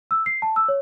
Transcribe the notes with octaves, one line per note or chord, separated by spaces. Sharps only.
E6
C7
A5
E6
C#5